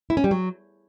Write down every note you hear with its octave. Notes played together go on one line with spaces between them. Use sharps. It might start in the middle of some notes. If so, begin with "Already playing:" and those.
E4
C#4
G3
F#3